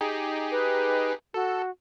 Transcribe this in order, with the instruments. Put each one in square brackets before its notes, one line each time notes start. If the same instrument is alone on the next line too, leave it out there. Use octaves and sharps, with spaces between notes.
[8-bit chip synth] D#4 G4 G#4
[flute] B4
[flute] F#4 [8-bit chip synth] A4